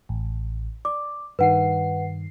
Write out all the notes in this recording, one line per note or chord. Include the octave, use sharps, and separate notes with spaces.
A1
D5 D6
G2 D#3 B4 F#5 C7